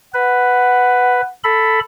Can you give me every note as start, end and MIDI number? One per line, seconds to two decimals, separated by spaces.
0.14 1.21 71
0.14 1.33 78
1.44 1.80 69
1.44 1.80 83